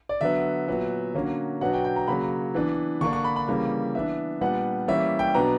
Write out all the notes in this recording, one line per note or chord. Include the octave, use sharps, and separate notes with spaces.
D5
D3 F#3 B3 E5
A#2 F#3 B3
D3 F#3 A#3 C#4
B2 F#3 B3 D4 F#5
G5
G5
A#5
C#3 F#3 A#3 B5
E3 B3 D4
D3 A#3 D4 C#6
C#6
B5
B5
C#3 E3 G3 A#3
E3 B3 D4 E5
A#2 G3 B3 D4 F#5
E3 G3 A#3 C#4 E5
G5
B2 F#3 B3 D4 A#5